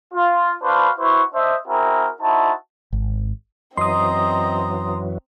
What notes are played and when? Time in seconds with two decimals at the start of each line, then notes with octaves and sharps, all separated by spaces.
0.14 F4
0.63 D4 F#4 B4 C5 F5 B5
0.99 E4 F#4 B4 C5 C6 C#6
1.34 D4 C5 D#5 E5
1.67 C4 E4 F#4 G#4 A#4
2.22 D#4 E4 F#4 C5 A5
2.93 G#1
3.77 F#2 E3 F#3 C4 D#5 A#5 C6 D#6